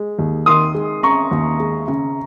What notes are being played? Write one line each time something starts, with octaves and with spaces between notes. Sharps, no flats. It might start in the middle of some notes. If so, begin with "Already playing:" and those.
Already playing: G#3
D#2
D#3 C6 D#6
G#3
C#4 A#5 C#6
D#2
G#3
C#3